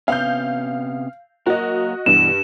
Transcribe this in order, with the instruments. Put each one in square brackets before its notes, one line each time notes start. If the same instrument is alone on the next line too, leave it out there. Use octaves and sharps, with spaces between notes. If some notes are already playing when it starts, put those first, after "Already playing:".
[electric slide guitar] C3 B3 C#4 [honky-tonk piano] F5 G6
[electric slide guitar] F#3 A#3 A#4 [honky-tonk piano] F#4 D#5
[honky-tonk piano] G2 [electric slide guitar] B2 E3 [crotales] E7